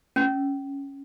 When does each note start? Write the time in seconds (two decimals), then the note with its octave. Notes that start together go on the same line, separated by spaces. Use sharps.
0.16 C#4